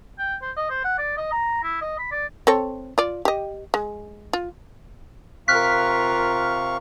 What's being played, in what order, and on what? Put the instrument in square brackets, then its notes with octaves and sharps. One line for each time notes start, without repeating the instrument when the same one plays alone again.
[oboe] G5
C5
D#5
C5
F#5
D5
D#5
A#5
E4
D#5
B5
D5
[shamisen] C4 A4 C#5
F4 D5
G4 D#5
G#3
F4
[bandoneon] C3 F5 C#6 [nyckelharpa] F4 A#4 [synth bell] F6 F#6 B6